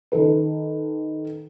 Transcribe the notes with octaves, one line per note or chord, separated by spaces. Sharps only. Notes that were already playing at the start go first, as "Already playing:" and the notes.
D#3 A4 B4